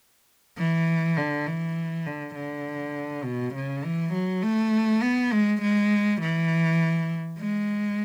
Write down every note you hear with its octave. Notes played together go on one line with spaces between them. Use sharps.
E3
D3
E3
D3
D3
B2
C#3
E3
F#3
A3
B3
G#3
G#3
E3
G#3